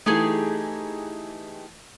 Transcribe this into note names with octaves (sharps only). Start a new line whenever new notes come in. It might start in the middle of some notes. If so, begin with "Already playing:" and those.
E3 A3 D#4 G4 G#4